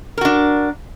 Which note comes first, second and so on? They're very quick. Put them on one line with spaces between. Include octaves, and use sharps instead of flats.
A#4 F#4 D4